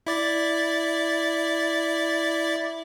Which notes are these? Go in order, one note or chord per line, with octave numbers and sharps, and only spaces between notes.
E4 D5 A6